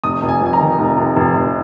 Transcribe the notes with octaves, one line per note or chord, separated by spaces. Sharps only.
F1 D#6
F1
G#5
F2 G#5
A#5
D#3
F1
F1
F1
F1